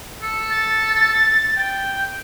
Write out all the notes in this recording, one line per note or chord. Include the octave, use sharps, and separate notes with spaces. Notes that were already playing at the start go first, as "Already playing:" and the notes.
A4
A6
G5